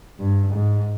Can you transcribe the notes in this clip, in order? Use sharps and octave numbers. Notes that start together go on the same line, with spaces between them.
G2
G#2